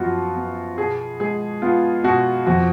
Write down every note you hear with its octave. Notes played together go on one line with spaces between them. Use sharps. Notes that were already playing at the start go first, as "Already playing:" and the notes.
Already playing: F#2 F3 B3 F4 F#4
B3
B2 G#4
G#3 G#4
B3 F4
B2 F#4
F2 F#4